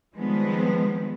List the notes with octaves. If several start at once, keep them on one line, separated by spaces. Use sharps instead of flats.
D#3 F3 G3 G#3 B3 C4